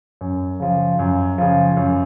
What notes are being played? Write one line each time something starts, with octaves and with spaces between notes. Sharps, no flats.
F#2
C#3 F3
F#2
C#3 F3
F#2